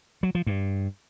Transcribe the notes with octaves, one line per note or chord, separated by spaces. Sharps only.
F#3
F3
G2